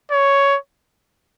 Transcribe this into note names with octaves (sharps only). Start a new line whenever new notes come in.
C#5